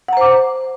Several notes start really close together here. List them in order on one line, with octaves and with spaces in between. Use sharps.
F#5 A#5 C5 D6